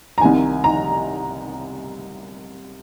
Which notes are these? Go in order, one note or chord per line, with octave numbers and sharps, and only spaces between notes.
A#5
C2 C3 D#3 G#5
A#5